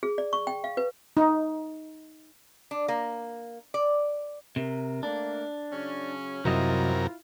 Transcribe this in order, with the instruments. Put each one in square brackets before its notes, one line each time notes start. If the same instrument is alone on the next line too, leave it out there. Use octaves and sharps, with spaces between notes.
[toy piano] G#4
D5
C#6
G5
F5
B4
[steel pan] D#4
[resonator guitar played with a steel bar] D4
A#3
D5
[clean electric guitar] C3 [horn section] A#4
[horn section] A3 A#3 [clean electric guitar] D4
[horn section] C#3 F#3 C#4
[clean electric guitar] C2 F#3 D#5 [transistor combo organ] F#2 C3 A#4 [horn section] E4 F4